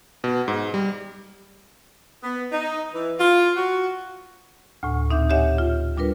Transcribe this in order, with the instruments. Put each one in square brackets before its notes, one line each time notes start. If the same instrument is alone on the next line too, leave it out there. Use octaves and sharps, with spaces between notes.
[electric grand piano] B2
G#2
G3
[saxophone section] B3
D#4
E3
F4
F#4
[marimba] D2 A2
A#2 C4 D#4 E5 D6 G6
G4 C#5 D#5 E5 F#5 G#5
F4
G3 D4 F4 A#4 B4